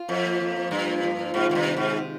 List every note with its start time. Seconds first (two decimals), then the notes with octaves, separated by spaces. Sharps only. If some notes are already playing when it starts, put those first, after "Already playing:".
Already playing: F4
0.08 F2 F3
0.25 A#3
0.40 F3
0.56 F4
0.71 G2 F3
0.88 A#3
1.03 F3
1.19 F4
1.34 G#2 C3
1.50 G#2 D#3
1.55 G2
1.65 C3
1.77 G#2 G#3
1.97 C3